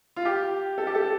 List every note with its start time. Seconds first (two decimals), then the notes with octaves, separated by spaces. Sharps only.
0.16 F4
0.25 G4
0.78 A4
0.87 G4
0.95 A4